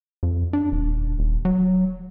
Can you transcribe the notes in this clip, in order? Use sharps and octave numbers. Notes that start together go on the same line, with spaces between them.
F2
D4
D#1
D#1
F#3